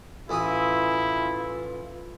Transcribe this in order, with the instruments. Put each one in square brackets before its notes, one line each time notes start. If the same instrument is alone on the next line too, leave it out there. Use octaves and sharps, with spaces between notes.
[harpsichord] A1 E3 D#6 [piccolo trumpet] E4 [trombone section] F4